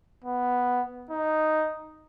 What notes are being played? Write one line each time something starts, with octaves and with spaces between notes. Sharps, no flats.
B3
D#4